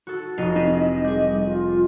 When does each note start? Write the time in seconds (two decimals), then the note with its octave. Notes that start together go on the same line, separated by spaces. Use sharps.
0.07 F#4 A4
0.38 F1 D#4 F4 D#5
0.56 C4 D#4 E4
1.04 G3 G#4
1.46 F4